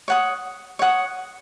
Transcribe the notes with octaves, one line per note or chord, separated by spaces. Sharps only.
C#5 F#5 D#6
C#5 F#5 D#6